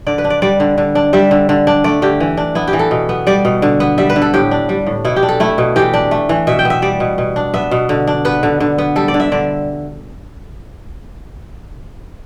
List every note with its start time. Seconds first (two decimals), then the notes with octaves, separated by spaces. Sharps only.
0.06 D3 D5
0.18 B4
0.24 D4
0.30 D5
0.42 G3 D5
0.60 D3
0.78 D3
0.95 D4
1.13 G3 E5
1.31 D3
1.49 D3
1.67 D4
1.84 A3 D5
2.02 D3 G4
2.20 E3
2.37 D4
2.55 B3 E4
2.68 G4
2.73 E3
2.79 A4
2.91 B2
3.09 B3
3.27 G3 D5
3.45 B2
3.62 D3
3.80 B3
3.98 G3 E5
4.10 B4
4.16 D3
4.22 A4
4.34 A2 G4
4.51 D4
4.69 G3
4.87 A2
5.04 B2 E4
5.16 G4
5.23 D4
5.29 A4
5.40 A3 E4
5.58 B2
5.76 E3 G4
5.94 D4
6.11 A3
6.29 E3
6.47 B2 E5
6.59 G5
6.65 B3
6.70 E5
6.82 G3 D5
7.00 B2
7.18 B2
7.36 D4
7.54 B3 E5
7.71 B2
7.89 D3
8.07 D4
8.25 B3 B4
8.43 D3
8.60 D3
8.78 B3
8.96 G3 A4
9.08 D5
9.14 D3
9.20 E5
9.32 D3 D5